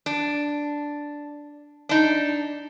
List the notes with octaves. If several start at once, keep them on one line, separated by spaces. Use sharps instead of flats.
D4
D4 D#4